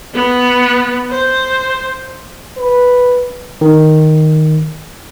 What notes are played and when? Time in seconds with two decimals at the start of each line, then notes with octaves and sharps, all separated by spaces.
0.14 B3
1.11 C5
2.57 B4
3.61 D#3